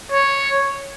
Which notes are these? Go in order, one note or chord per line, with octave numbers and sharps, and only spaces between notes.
C#5